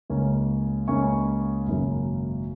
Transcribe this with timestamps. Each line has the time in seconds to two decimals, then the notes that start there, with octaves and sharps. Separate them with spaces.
0.10 C#2 C#3 A#3 C#4
0.88 C#2 C#3 A#3 C#4 G#5 C#6
1.67 G#1 F#2 C#3 F#3 A#3